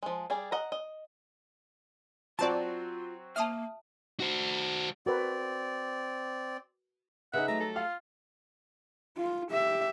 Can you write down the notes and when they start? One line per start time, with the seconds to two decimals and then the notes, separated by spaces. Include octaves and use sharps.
0.03 F3 G#3
0.30 G3 G#4 D5
0.52 D#5 F#5 A#5
0.72 D#5
2.39 F#3 C4 F4 F#4 D5 A5
3.36 A#3 E5 A5 D#6 F6
4.20 F#4 C5
5.06 C4 F#4 A#4 B4 D5
7.33 C#3 D#4 G#4 B4 E5 F#5
7.48 F#3 G3 A3 A#5
7.60 A4
7.76 F4 F5
9.17 F4
9.52 G4 E5